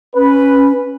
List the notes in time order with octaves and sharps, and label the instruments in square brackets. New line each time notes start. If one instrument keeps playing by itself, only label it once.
[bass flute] C#4 [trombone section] B4